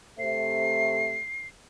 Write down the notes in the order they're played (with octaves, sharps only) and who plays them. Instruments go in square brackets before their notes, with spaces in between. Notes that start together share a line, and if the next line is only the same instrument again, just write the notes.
[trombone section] C3 A3 [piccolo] C7